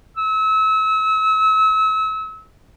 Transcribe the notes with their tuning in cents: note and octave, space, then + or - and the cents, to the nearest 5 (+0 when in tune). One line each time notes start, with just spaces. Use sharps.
E6 -35